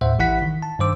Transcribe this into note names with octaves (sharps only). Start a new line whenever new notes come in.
D#2 A2 C5 E5 F#5
A1 E3 E4 F#5 B6
D#3
A5
G2 D#3 C5 D6 E6